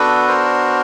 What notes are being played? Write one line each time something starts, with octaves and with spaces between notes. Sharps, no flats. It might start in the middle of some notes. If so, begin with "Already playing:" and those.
Already playing: B3 D4 F#4 A4 B4
A#4 C5